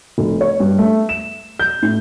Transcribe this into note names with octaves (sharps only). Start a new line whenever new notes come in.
F1
C#5
G2
A3
E7
G6
A2